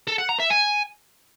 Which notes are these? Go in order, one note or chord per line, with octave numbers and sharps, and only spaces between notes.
A4
F#5
A#5
E5
G#5